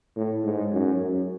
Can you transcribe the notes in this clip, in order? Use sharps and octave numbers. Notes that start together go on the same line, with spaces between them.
A2
G#2
F#2
F#2